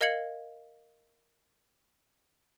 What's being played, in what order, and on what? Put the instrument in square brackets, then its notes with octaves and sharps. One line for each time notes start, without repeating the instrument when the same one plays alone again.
[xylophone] A#4 D#5 F5 G#6 C#7 F#7